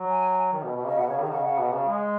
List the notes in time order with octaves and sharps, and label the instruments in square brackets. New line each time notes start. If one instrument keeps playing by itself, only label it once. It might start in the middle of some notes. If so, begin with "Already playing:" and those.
Already playing: [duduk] F#3
[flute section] G#5
[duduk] D#3
B2
B2
[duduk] C#3 [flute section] D#5
[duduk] B2 [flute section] F#5
[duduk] C#3 [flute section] C#5
[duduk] D#3 [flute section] G#4
[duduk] C#3 [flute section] F#5
[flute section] D#5
[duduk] C#3 [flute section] F#5
[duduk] B2
C#3
G#3